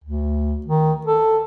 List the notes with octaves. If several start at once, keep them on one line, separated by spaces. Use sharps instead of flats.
D2
D#3
A4